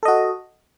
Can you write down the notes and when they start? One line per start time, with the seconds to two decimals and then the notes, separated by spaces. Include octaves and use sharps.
0.03 A4
0.05 D#5
0.08 F#4